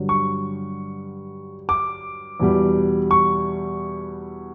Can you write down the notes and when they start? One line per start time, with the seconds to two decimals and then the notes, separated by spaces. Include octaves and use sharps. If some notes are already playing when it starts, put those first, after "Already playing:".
Already playing: G2 D3 F#3
0.09 C#6
1.69 D6
2.40 E2 B2 G3
3.11 C#6